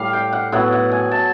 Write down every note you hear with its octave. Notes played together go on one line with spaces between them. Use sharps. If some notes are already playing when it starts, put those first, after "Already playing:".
Already playing: A2 G3 F5
G5
F#5
A2 F#3 B3 F#5
F#5
G#5
A5